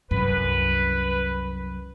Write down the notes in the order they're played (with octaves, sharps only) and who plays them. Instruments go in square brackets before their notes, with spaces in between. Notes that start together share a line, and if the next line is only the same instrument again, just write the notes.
[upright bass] C2 F#2 [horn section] B4